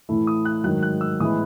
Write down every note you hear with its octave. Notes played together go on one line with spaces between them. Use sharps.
A2 E3 A3 E4
D#6
F#6
G#2 D#3 F#3 F#6
F#6
E6
A2 E3 G#3 B3 E4 D#6